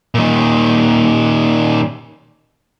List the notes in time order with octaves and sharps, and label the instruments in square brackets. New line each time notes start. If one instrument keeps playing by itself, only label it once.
[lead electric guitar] A#2 D#3